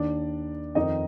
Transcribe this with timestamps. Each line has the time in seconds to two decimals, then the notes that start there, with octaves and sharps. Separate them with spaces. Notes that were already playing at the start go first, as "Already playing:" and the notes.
Already playing: D#2 D#3 D4 D5
0.75 F2 D#3 D#4 D#5